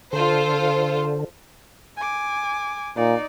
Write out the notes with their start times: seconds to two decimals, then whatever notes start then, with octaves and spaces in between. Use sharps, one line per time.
0.13 D3 F4 A4 C5
1.97 G#5 D6
2.97 A#2 D#4 D5